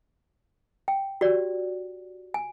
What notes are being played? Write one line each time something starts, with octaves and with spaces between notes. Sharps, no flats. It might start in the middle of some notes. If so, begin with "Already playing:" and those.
G5
F#4 G4 D5
G#5